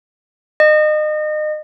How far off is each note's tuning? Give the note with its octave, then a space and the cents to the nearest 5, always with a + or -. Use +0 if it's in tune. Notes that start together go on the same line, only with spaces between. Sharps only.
D#5 -30